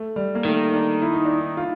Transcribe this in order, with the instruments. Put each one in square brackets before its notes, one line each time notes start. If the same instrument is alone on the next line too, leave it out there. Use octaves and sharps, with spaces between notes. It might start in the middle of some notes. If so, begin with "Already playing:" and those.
Already playing: [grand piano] A3
G3
A#3
[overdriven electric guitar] D#3 [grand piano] A3
[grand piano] D4
E4
D#4
D4
D#4
F4